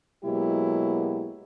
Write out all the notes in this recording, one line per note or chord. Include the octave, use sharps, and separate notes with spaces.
B2 F#3 G#3 A#3 E4 G4